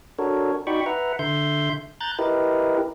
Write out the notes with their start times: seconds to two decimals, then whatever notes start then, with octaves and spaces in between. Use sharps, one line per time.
0.19 D4 F#4 A4 A#4 C#5
0.67 D#4 F#4 D5 G5 B5 C#6
0.86 B4 E5 F#5 A#5
1.19 D3 E5 C6 G6
2.01 A#5 F#6 G6 A6
2.19 E4 G4 A#4 B4 D#5